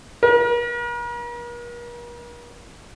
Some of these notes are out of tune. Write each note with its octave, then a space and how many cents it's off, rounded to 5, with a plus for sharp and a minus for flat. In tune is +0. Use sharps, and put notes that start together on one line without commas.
A#4 +45